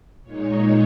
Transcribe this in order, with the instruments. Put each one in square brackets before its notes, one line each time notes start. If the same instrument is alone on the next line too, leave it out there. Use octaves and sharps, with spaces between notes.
[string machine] A#2 G#3 D#4 C#5